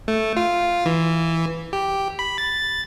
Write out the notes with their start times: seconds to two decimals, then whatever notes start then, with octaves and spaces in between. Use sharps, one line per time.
0.08 A3
0.37 F4
0.85 E3
1.73 G4
2.19 B5
2.38 A6